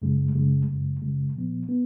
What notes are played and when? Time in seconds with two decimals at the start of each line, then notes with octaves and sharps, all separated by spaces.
0.02 F#2 C#3 G#3
0.35 F#2 C#3 G#3
0.68 F#2 C#3 G#3
1.02 F#2 C#3 G#3
1.35 A#2 F3 B3
1.69 B3